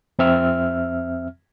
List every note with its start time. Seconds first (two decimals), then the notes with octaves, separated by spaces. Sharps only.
0.19 F2 C4 E5 F6